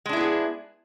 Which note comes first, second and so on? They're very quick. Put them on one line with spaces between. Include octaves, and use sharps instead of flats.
G#3 D4 E4 B3 G#4